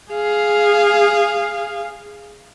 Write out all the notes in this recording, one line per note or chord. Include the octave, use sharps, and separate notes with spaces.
G#4 F5